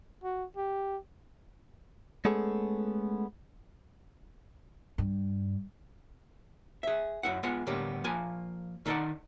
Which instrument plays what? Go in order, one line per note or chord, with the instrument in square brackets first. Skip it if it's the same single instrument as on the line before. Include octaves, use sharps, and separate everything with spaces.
[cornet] F#4
G4
[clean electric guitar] G#3 A3 B3 C#4 G#4 A4
[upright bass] G2
[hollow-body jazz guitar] G#4 E5
F#2 E4 F#5
G#3 B3 F4 F#5
A2 D3 G3 A#3 B3 G4
F3 A#3 G#5
D#3 D#4 A4 C5 D5 F#5